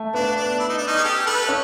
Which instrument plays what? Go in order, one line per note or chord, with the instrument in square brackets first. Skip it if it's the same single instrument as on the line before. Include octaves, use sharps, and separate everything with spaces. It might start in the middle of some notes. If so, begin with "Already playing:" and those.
Already playing: [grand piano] A3
[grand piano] B3 [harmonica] D4
[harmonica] D4
E4
D#4
D4
C#4 D#4
G#4
G4 A4
A4 B4
[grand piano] C#4